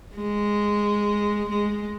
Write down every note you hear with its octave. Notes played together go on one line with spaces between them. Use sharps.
G#3
G#3